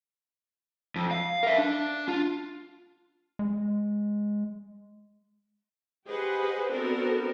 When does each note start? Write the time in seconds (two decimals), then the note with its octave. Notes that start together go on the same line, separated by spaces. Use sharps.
0.96 F2
1.11 F5
1.43 A#4 E5
1.58 D4
2.08 F4
3.39 G#3
6.07 G4 G#4 B4 C5 D#5 F#5
6.70 B3 C4 D4 F#4 A4 A#4